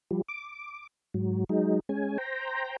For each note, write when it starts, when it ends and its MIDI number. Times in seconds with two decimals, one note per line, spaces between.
0.11 0.22 53
0.11 0.22 55
0.29 0.87 86
1.14 1.44 44
1.14 1.44 54
1.49 1.80 54
1.49 1.80 56
1.49 1.80 63
1.89 2.18 56
1.89 2.18 61
1.89 2.18 80
2.18 2.76 72
2.18 2.76 79
2.18 2.76 82